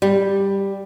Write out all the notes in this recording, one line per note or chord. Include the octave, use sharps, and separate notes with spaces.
G3